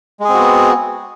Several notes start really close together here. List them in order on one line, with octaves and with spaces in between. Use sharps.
G#3 G#4 C4 F#4 B3